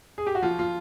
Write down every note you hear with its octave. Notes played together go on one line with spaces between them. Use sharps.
G#4
G4
F#4
F3 F4
F4